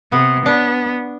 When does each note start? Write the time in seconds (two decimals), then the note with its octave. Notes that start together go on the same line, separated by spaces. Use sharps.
0.12 C3 B3
0.46 B3 D4